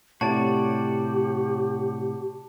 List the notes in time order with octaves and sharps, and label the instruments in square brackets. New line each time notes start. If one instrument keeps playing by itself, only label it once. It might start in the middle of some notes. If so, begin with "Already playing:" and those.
[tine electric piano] A2 C3 [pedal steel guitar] F#4 C#5 D5 [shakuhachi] G4 [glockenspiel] A5